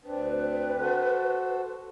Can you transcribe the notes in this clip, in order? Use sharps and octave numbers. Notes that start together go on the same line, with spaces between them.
D2 C4 D4 B4
F#4 A4 C5